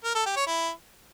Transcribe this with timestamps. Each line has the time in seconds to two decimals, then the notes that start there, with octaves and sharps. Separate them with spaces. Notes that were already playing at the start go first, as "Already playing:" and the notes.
0.04 A#4
0.15 A4
0.26 G4
0.36 C#5
0.47 E4